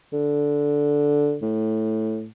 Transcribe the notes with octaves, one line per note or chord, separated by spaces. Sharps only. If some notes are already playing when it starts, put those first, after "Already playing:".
D3
A2